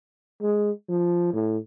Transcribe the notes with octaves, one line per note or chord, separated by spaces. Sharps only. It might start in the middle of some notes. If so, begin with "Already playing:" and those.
G#3
F3
A2